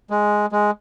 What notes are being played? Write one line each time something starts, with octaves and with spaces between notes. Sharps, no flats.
G#3
G#3